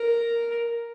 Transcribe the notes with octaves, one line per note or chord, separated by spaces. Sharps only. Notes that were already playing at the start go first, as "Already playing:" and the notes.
Already playing: A#4